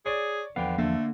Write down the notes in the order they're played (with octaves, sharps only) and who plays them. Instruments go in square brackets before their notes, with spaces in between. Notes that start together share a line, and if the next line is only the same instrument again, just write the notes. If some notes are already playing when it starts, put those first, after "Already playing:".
[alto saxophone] G#4 [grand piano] C#5 D5
[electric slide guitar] E2 F3 F5 [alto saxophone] D3 [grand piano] B3 G5
[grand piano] D3 [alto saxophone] A3 [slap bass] A#3